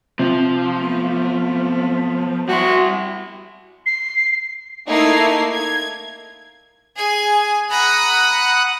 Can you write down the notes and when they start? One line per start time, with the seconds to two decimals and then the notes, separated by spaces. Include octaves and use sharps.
0.19 C3 F3
0.77 A3 B3
2.49 G3 E4 F#4 C6
3.86 C7
4.87 A3 A#3 D#4 E4 G#6 C7
5.51 G#6
6.96 G#4 G#5
7.70 F#5 A#5 B5 D#6 F#6